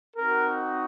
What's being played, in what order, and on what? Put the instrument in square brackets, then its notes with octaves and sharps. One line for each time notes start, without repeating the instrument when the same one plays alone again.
[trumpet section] C4 D#4 F#4 A#4